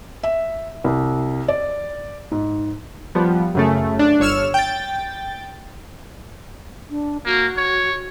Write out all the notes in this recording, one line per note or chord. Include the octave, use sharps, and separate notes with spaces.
E5
C2
D5
G#2
F3 G3 B3
F#2 C#3 A3
D4
G1 C#5 E6 F6 E7
G5 A6
D4
A#3 F#4
C#5